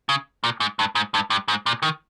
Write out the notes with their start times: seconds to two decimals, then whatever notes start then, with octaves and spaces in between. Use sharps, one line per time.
0.09 C#3
0.44 A#2
0.60 G#2
0.79 G2
0.95 G#2
1.14 G2
1.30 G2
1.48 G#2
1.66 A#2
1.83 D#3